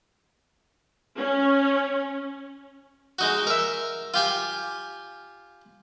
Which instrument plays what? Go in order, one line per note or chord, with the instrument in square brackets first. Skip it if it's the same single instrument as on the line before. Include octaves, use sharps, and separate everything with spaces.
[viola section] C#4
[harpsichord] G#3 D#4 F#4
A#4 E5
F4 G4 G#5